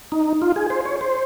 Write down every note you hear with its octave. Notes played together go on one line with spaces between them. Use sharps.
D#4
F4
G#4
C5
C#5
C5